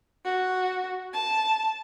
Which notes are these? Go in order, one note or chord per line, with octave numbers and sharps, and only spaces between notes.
F#4
A5